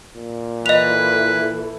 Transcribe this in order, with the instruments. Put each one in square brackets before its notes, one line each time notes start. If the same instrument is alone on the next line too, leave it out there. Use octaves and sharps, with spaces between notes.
[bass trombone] A#2
[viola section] E3 E4 A4 [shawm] B4 [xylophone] D#5 F7